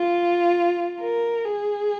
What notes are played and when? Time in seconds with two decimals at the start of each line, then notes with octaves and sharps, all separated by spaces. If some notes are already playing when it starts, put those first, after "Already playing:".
Already playing: F4
1.01 A#4
1.45 G#4